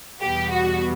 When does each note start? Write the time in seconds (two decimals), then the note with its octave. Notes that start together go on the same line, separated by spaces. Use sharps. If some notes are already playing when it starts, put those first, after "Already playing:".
0.22 E2 B2 G3 B3 G4
0.50 F#4